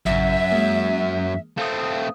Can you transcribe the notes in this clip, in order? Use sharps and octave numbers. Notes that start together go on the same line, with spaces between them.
A1 F#2 C#3 E5
G#3 A#3
A3 C4 F5 D#6